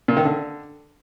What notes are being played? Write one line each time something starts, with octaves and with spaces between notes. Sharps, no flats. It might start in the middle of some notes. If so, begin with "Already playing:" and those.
A#2
D#3
D3